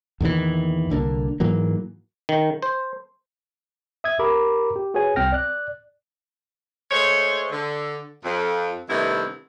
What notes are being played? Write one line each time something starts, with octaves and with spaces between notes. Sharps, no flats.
E2 A#2 D#3 E3
C2 D3 A#3 D4
G#2 E3 F#3 A#3
D#3
C5
E5 D#6 E6 G#6
G4 A#4 A#5 B5 D6
G4
F#4 G#4 B4 C#5 G#5
C2 C4 G5 F6 A#6
D5 F#6
G#3 A3 C5 C#5
D3
F2
G2 C3 D#3 A3 B3 E4